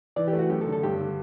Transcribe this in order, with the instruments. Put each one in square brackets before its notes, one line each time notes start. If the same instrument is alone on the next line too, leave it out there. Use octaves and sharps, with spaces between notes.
[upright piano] E3 [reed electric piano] D5
[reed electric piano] G4
[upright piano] A3
[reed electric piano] F#4
[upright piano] F#2 [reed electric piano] G4
[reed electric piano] A4
[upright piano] D3
[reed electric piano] A4
[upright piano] G2 [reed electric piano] G4
[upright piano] D3